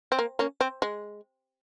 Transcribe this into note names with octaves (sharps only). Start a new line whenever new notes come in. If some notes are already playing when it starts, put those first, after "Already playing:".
C4
A#3
A#3 C#4
C4
G#3